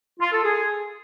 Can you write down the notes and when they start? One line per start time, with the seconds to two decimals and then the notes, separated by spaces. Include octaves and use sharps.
0.20 F4
0.32 A4
0.44 G#4